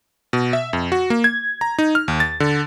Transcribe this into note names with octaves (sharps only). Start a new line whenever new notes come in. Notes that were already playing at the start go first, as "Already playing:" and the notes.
B2
E5
F2
F#4
A#3
G#6
A#5
D#4
F6
D#2
A6
D3